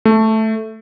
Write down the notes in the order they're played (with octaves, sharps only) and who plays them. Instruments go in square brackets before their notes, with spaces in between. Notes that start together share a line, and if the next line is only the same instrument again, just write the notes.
[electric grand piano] A3